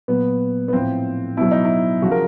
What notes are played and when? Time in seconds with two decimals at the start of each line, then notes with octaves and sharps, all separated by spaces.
0.08 A#2 F#3 B3
0.68 B3
0.73 A2 F3 C4
1.37 B2 F#3 E4
1.51 D#4
1.65 E4
2.02 C#3 F3 F#4
2.11 A#4